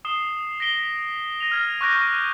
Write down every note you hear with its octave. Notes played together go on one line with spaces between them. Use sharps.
D#6 C7 E7 G7
A#6 B6 D7 G7
A#6 D#7 F7
F6 G#6 A6
C#6 D6 F#6 G6 A#6 D7